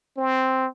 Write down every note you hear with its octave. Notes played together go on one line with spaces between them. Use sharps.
C4